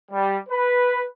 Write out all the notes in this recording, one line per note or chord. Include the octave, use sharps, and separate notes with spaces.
G3
B4